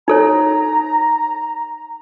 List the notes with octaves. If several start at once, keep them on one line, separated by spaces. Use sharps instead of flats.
D#4 A4 C#5 A#5